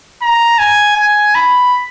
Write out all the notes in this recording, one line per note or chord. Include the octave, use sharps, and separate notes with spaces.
A#5
G#5
G#5
B5